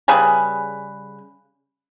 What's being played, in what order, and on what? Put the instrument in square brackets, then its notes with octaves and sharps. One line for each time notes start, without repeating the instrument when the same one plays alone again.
[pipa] C#3 G3 G#4 B4